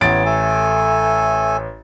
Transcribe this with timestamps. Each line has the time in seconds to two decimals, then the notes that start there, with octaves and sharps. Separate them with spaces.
0.01 A1 B3 C#5 A6 D7
0.25 A3 A4 G#5